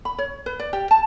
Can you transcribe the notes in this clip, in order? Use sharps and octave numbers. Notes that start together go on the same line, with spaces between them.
B5
C#5
B4
D5
G4
A5